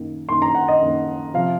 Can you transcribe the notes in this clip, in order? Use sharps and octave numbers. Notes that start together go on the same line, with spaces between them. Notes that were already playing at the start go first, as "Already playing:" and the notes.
Already playing: F#2 D#3 A#3
F#2 D#3 A#3 C6
A#5
F#5
D#5
F#2 D#3 A#3
C3 F3 F5